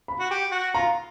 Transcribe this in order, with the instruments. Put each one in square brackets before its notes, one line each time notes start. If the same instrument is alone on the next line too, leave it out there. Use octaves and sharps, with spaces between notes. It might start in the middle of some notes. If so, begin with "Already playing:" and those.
[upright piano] B5
[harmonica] F#4
G4
F#4
[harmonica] F4 [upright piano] A#5